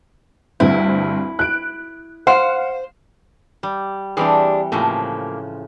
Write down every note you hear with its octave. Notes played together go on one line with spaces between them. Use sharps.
D2 G2 C4 E4
F#6 D7
C5 F5 F#5
G3
E3 G3 C4 D4 G4 G#4
A2 C#3 F3 A3 A#3 F4